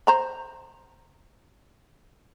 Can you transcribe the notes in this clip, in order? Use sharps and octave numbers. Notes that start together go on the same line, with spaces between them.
C5 A#5 B5